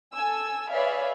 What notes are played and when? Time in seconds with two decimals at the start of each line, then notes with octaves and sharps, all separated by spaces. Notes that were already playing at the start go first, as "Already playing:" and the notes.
0.14 A4 G#5 E6
0.71 G#4 B4 C#5 D5 E5 F5